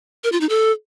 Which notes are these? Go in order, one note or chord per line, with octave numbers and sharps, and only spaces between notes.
A#4
F4
D#4
A4